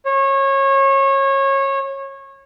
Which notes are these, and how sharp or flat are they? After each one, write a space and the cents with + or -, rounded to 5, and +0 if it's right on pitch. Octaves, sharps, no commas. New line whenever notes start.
C#5 -25